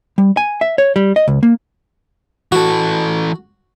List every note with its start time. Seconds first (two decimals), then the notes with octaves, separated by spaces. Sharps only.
0.18 G3
0.37 G#5
0.61 E5
0.78 C#5
0.96 G3
1.16 D#5
1.28 C#2
1.43 A#3
2.52 E3 F#4 A4